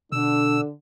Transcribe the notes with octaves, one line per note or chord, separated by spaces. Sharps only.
B2 D3 D4 E6